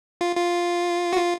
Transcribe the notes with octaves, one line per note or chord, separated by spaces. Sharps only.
F4
F4
F#4
F4